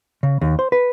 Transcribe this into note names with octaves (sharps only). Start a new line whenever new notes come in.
C#3
D#2
C5
B4